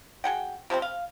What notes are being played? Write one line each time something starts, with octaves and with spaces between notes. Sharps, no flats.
F#4 G#4 F#5 G5
C3 F3 G3 C4
F5